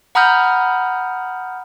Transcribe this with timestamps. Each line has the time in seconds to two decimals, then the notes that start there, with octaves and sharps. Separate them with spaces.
0.15 F#5 A#5 B5 D#6 F6 G6